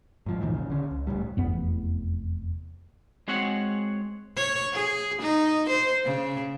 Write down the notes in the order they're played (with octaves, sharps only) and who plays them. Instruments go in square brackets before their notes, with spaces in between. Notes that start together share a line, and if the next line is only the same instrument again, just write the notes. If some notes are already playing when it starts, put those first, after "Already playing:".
[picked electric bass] G#2 F3
D#2 A#2 D#3 E3
A#1 C#3
D3 C#4
C#2
D1 A2 G3
[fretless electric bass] F1 E2 B3
[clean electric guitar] G#3 C4 F#4 G#4 C#5 F#5
[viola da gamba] C#5
G#4
D#4
C5
C#3